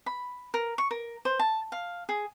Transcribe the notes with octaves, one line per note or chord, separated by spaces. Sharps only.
B5
A#4
C#6
A#4
C5
A5
F5
G#4